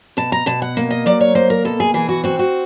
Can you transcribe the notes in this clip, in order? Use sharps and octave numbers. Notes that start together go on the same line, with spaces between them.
B2 A5
A#5
B2 A5
F#5
A#3
D#5
F#3 D5
C#5
A#3 C5
A#4
B2 A4
G#4
E3 G#4
F#4
C4 F#4
F#4